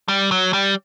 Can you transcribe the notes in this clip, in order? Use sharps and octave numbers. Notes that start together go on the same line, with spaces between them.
G3
F#3
G3